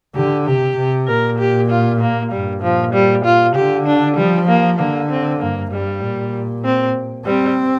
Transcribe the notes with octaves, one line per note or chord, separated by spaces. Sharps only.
D3 G4
C3 G4
C3
A#2 A#4
G4
F4
A#3
G2 G3
A#2 F3
G3
F4
D3 G4
D4
F3 G3
A#3
D3 A#3
C4
G2 A#3
G2 G3
A#2
C4
G3 C4